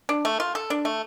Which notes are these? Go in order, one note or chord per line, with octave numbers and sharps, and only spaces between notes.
D4
A3
F4
A4
D4
A3